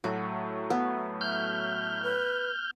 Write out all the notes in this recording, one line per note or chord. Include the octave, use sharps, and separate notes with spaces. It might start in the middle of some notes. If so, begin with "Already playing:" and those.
A2 F#3 A3 F#4
B3
E5 F6 G6
B4